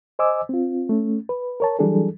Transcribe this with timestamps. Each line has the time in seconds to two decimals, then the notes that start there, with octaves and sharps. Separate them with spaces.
0.19 C5 D#5 G#5 D6 E6
0.49 C4 F4
0.89 A3 C#4
1.29 B4
1.60 A#4 C#5 A5
1.79 E3 F#3 G3 D4 G#4 A4